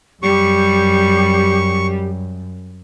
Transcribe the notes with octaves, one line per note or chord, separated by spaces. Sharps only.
F#2 G3 G4 C#6